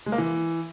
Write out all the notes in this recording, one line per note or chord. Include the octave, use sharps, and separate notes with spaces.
G#3
A#3
E3